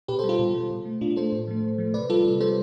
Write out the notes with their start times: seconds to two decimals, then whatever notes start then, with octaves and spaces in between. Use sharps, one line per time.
0.08 B2 G4 B4
0.19 A4 C5
0.24 G3
0.29 F4 A4
0.39 B2
0.55 G3
0.70 B2
0.85 A3
1.01 B2 D4 F4
1.16 A3 A4 C5
1.32 A2
1.47 F3 A3
1.63 A2
1.78 F3 A3
1.94 C3 B4 D5
2.09 G3 F4 A4
2.25 C3
2.40 G3 A4 C5